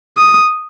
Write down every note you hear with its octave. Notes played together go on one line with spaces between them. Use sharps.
D#6